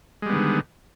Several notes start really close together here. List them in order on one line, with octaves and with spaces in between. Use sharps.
G#3 G3 B3 D#3 D3